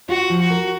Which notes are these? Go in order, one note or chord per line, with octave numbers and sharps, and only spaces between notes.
F4 F#4
F3
F#4
A#4